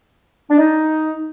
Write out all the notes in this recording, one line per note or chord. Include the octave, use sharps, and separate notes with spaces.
D4
D#4